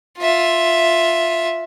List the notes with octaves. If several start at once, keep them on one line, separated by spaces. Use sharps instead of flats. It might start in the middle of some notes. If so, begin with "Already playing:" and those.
F4 E5